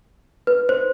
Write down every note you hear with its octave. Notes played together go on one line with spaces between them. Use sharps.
B4
C5